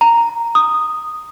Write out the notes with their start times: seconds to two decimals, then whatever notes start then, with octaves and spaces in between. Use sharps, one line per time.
0.01 A#5
0.55 D#6